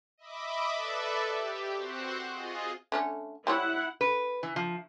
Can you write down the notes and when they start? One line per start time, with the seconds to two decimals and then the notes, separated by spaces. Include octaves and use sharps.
0.18 D#5 E5 B5 D6
0.74 A4 B4 D5 E5
1.27 G4
1.75 C4 F#4 C5 F#5
2.29 F4 G#4 D#5
2.92 D3 A3 C#4
3.47 G3 E4 C5 C#5 F#5
4.01 B4
4.43 E3
4.56 F3